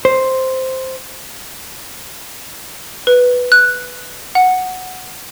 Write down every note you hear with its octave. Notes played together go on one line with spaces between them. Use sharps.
C5
B4
F#6
F#5